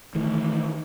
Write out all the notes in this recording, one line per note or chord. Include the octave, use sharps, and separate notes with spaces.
D#3 E3 A3